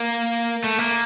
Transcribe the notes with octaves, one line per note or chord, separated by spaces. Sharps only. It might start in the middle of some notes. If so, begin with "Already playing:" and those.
Already playing: A#3
A3
A#3